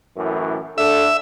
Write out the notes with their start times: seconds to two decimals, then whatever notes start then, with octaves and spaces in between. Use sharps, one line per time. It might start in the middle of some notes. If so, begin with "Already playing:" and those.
0.17 F#2 A2 E3
0.78 D3 D4 A4 E5